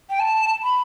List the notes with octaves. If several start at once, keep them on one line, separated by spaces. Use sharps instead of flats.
G5
A5
B5